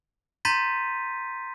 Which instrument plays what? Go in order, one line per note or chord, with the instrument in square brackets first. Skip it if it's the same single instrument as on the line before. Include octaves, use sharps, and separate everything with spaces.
[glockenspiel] A#5 C6 G6 A6 B6 D#7